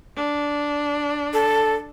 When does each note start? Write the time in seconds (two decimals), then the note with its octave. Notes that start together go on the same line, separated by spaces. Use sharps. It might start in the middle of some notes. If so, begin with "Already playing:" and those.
0.16 D4
1.33 A4